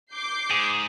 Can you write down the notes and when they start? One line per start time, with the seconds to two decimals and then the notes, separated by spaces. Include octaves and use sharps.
0.12 D6 G6 C7
0.50 G#2 G#4